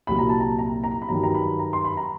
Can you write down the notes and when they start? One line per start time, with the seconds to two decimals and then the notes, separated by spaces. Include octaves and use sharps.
0.07 C2 A#2 F#3 B5
0.19 A#5
0.29 A5
0.40 A#5
0.59 A#5
0.84 A#5
1.02 B5
1.08 G2 D#3 F#3 A#5
1.23 A#5
1.34 B5
1.59 A#5
1.73 C6
1.85 B5
1.97 A#5